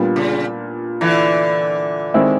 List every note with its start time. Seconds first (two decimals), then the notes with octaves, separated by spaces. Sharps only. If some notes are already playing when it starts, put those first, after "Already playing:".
Already playing: A#2 G3 B3 D4 F4
0.16 C#3
1.01 D3 E3
2.14 D#3 G#3 C4 E4